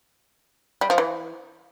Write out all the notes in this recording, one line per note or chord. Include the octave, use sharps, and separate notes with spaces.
G3
F3
E3